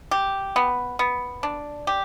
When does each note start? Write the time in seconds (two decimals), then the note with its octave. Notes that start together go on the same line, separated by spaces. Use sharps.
0.11 G4
0.56 B3
0.99 B3
1.43 D4
1.87 G4